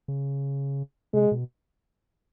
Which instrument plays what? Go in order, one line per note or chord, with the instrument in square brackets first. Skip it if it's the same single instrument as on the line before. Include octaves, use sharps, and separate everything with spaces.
[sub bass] C#3
[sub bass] C3 [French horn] G#3
[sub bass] B2